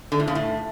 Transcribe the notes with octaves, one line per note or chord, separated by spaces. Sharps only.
D3
A2
C#3
A2